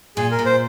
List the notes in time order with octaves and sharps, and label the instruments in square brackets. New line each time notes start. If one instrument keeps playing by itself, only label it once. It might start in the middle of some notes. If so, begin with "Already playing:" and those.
[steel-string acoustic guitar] A#2 [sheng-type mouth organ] G#4
[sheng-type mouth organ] A#4
[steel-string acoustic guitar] A#2
[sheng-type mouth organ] C5